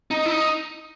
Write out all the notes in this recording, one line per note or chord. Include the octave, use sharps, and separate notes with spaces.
D#4
E4
D#4